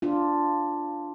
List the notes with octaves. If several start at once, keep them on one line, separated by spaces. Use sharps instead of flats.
D4 F4